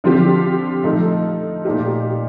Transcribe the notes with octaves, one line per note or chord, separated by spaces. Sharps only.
D3 F3 C4 G4
F3 A3 D#4 A4
A#2 A3 D#4 G4